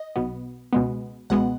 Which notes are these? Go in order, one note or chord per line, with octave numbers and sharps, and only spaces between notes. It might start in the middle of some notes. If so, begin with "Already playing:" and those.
Already playing: D#5
B1 B2 B3
C#2 B2 G#3 B3
C#2 B2 G#3 B3 F#5